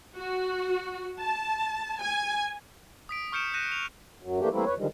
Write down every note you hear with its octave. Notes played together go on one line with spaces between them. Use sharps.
F#4
A5
G#5
D#6 B6 D7
C#6 F6 G6 C#7 D7 E7
F#6 G6 A#6 C#7 D#7 E7
F7
F#2 F#3
E3 A3 A#3 D4 G4
E3 G3 A3 A#3 C4 E4
F2 B4 C#5
D3 D#3 F3 G3 G#3